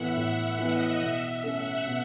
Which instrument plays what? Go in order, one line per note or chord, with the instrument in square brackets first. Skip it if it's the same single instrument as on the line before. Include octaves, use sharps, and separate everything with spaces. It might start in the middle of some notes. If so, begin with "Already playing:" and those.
Already playing: [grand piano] A2 E3 B3 E4 [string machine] E5 F#5
[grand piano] A2 [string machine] F#5
[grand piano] E3 B3 E4 [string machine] D#5
[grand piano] B2 [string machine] E5
[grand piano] A3 C#4 [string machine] F#5
[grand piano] B2